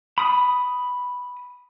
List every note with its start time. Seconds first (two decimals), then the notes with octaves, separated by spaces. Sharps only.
0.18 B5 D#6